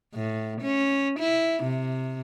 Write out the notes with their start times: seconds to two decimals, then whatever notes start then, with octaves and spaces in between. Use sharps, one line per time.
0.14 A2
0.61 C#4
1.19 E4
1.63 C3